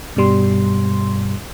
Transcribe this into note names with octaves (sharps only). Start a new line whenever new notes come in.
G2 B2 G3 C6